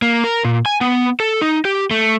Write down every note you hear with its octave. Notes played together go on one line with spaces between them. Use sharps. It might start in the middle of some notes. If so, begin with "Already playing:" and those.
A#3
A#4
A#2
G#5
B3
A4
D#4
G4
A3